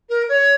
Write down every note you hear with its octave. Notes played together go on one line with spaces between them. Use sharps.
A#4
C#5